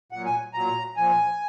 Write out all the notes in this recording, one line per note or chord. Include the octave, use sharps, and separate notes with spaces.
A#2 F#3 F#5
G#5
A#2 F#3 A#5
A#2 F3 G#5